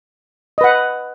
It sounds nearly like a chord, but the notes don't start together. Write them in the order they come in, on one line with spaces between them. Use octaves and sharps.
D#5 B4 F#5